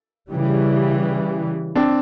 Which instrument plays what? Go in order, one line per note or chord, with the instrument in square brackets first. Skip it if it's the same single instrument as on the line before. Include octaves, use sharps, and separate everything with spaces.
[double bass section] C#3 E3 G3
[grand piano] C4 D4